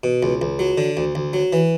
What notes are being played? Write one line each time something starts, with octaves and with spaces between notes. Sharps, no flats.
B2
C#2
C#2
F#3
D3
D2
D2
F#3
E3